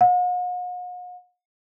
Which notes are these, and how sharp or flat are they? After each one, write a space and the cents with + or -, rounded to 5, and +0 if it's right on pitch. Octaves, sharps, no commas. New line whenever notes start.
F#5 -45